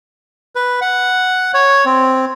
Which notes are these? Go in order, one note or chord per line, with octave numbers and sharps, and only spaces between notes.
B4
F#5
C#5
C4